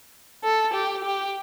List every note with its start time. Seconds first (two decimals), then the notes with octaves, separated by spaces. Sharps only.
0.44 A4
0.74 G4
1.04 G4